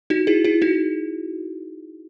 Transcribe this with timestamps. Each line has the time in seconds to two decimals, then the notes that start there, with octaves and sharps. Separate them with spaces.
0.10 D#4 F#4
0.27 E4 G#4
0.44 E4 G#4
0.62 D#4 F#4